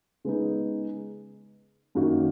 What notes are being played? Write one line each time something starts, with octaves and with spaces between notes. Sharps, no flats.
C#3 G#3 B3 D#4
F#2 D#3 A#3 D#4 F#4